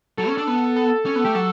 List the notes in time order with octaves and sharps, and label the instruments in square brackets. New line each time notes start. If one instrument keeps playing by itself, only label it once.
[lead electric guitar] F#3 [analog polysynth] A4
[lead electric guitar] C#4
D4
B3
[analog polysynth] A4
[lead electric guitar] C#4
B3
[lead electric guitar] A3 [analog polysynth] G4
[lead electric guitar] F#3 [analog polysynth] A4